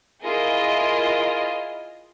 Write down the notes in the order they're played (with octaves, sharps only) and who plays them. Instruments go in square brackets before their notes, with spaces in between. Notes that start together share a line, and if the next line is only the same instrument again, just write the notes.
[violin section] E4 F4 G#4 A#4 D#5